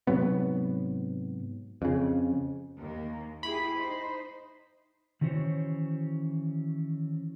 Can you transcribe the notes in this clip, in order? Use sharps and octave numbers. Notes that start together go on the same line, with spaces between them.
G#2 C3 F#3 B3
F2 C#3
D#2 A#3
E4 G4 G#4 B5
D#4 C5
D#3 E3 C#4 F#4 C5 C#5